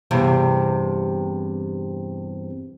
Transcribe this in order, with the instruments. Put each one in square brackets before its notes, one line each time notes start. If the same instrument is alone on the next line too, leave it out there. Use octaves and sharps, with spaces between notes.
[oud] E2 G2 C3